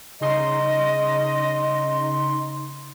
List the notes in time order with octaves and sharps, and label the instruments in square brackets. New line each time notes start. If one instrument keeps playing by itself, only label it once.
[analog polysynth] C#3 D#4 C6 [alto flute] D#5